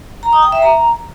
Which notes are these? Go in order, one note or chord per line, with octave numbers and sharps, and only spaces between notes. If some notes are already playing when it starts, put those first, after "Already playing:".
A#5
D#6
G5
E5
A#5